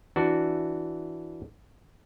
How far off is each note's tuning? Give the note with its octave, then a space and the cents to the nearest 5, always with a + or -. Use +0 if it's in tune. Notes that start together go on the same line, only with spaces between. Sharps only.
E3 +0 D4 +0 F#4 +0